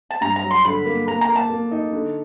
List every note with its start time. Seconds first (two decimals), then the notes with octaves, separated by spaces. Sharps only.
0.11 A5
0.21 G2 A#5
0.36 A#5
0.43 F#3
0.51 C6
0.65 D3 B5
0.85 A#3
1.07 A#3 A#5
1.21 A#5
1.28 A#3
1.36 A5
1.50 A#3
1.71 D#4
1.93 D3